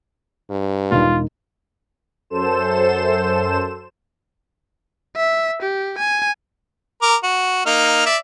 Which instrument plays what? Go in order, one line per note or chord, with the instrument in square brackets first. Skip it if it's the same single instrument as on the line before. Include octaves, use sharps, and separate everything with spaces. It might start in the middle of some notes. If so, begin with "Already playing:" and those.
[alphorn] G2
[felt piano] E1 D#4 [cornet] F4
[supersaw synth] F#2 A4 C5 E7
[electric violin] E5
G4
G#5
[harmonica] A#4 D6
F#4
A#3 D#4 F6
D5 E5